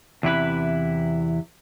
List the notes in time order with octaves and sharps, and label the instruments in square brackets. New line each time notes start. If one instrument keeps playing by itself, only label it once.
[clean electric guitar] E2 C3 E4 B4